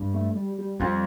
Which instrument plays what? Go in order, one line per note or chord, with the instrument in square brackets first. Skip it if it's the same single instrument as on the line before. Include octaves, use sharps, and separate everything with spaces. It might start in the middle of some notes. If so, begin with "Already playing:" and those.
Already playing: [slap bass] G2
[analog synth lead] A3
G3
G3
[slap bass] F2 [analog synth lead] G3